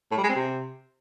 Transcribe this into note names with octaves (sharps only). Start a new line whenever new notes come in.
A2
G3
G#3
C4
C3